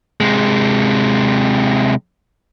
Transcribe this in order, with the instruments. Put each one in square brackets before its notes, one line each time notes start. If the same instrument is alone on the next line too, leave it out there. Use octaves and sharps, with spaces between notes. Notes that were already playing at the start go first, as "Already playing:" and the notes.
[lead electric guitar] C3 G#3